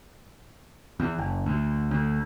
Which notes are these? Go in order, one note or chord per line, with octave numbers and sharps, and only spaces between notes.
E2
F#1
D2
D2